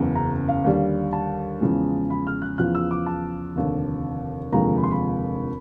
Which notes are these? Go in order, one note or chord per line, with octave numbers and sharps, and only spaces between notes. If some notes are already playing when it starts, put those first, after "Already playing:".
Already playing: F#1 E2 C#3
A#5
F5
D#2 D3 G3
A5
E2 C#3 F3 G#3
B5
F6
F#6
E2 C#3 F3 F#6
E6
D6
A5
F1 D#2 D3
F1 D#2 D3 F3 G#3 A#5
B5
C6
B5